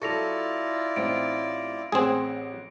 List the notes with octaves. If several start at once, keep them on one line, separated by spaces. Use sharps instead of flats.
F#3 E4 F4 A4 D5 C#6 A#6 F7
A1 C4 D#4 D7
A1 C4 G#4 F#5 C6